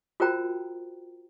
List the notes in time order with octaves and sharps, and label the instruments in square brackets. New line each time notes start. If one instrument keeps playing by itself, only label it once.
[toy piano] F4 F#4 A#4 C5 G5 A#5